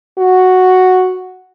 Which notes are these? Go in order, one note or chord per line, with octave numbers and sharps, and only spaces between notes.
F#4